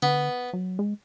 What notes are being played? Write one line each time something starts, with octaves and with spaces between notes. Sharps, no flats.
D3 B3
F#3
G#3